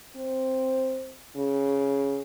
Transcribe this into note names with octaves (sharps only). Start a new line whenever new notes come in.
C4
C#3